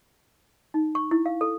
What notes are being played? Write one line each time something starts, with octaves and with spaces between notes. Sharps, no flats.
D#4
C#6
E4
F5
A4